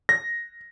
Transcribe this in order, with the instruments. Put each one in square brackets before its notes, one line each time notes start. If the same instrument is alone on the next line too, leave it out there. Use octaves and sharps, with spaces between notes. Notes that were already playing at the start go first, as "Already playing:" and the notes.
[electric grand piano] A#6